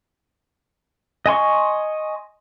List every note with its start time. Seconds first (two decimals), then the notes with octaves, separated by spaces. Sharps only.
1.26 D#5 G#5 C6 C#6